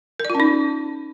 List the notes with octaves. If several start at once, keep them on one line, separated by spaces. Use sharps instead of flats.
A#4
D5
F4
C#4
D#4